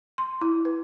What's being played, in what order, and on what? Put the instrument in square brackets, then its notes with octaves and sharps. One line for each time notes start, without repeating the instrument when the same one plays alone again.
[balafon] C6
E4
B4